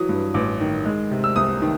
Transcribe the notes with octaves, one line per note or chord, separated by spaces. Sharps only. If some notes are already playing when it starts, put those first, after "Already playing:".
Already playing: E3 F#3 D#6
G2
A1 D6
D#3
G#3
C3
E6
C2 D#6
D#3